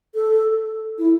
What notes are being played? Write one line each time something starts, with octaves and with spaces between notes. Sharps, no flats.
A4
E4